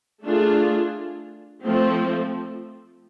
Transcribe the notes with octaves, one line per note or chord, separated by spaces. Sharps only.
A3 D4 F4 G#4
F3 A3 C4